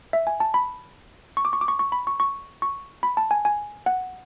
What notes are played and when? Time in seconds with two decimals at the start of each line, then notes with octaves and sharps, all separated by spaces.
0.13 E5
0.27 G#5
0.40 A5
0.54 B5
1.37 C#6
1.45 D6
1.53 C#6
1.61 D6
1.68 C#6
1.79 C#6
1.92 B5
2.07 C#6
2.20 C#6
2.62 C#6
3.03 B5
3.17 A5
3.31 G#5
3.45 G#5
3.86 F#5